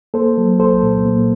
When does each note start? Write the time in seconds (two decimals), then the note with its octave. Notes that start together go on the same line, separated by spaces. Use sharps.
0.14 A#3 A4 C5
0.37 F#3
0.59 C2 A4 C5
0.83 A#2
1.05 A#3